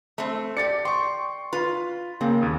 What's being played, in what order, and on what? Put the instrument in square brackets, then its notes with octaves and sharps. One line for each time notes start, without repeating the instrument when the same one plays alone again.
[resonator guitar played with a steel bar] A3 C4
[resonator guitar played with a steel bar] G4 D5 [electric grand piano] A6 C#7
[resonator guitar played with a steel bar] G5 [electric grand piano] C6 C#6
[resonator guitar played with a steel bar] F4 [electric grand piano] B4
[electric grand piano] C#3 A#3 [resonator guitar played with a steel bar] C4
[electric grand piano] D#2 D#6